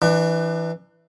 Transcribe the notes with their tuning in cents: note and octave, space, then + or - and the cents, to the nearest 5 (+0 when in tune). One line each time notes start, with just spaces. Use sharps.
E3 +0 D4 +35